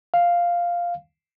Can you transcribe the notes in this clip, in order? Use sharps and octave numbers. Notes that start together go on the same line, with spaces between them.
F5